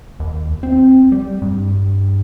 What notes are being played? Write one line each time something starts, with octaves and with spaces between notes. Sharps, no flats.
D#2
C4
G3
G2